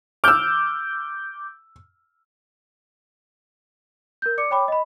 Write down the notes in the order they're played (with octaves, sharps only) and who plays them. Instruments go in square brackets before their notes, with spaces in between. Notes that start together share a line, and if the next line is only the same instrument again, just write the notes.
[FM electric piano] D6 G6 [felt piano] E6 F6
[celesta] A#4 G6
D5 D6 C#7
C#5 G5 B5 D6
D#5 B5